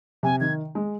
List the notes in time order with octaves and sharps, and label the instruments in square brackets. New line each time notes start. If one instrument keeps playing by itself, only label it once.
[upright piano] C3 [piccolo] G#5
[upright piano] D#3 [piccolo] G#6
[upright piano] G#3